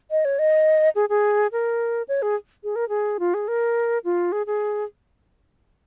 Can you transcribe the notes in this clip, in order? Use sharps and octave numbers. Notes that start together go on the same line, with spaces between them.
D#5
C#5
D#5
G#4
G#4
A#4
C#5
G#4
G#4
A#4
G#4
F4
G#4
A#4
F4
G#4
G#4